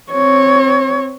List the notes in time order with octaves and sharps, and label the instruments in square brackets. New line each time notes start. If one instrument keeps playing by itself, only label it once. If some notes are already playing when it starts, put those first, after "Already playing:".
[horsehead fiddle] C4 C#5